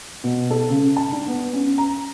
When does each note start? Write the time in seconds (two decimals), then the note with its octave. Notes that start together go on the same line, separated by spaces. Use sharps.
0.24 B2
0.51 A4
0.70 C#3
0.96 A5
1.12 D4
1.27 B3
1.53 C#4
1.78 A#5